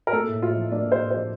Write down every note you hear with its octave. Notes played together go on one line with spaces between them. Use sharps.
A#4
A#3 A4
A2
A2 F4
F3
A#3 D4
A2
C5
A2
F3 C5